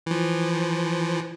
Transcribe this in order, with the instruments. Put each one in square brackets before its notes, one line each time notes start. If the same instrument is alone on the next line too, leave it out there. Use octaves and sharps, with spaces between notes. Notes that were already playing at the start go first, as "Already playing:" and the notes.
[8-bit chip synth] E3 F3